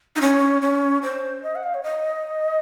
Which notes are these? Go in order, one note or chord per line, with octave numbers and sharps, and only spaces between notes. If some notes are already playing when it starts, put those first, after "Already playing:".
D#4
C#4
C#4
C5
D#5
F#5
F5
C#5
D#5